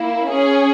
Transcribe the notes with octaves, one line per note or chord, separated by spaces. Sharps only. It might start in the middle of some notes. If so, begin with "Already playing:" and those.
Already playing: A#3 E4
C#4 G#4